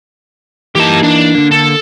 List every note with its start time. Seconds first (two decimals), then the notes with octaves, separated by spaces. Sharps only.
0.75 E3 A#3 D#4 G4 A5
1.03 D4
1.35 D3 A#3
1.51 A4